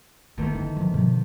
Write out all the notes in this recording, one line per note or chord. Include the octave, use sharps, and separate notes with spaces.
E2 D3 D#3 A3 B3
D#4 E4
F3
B2 F3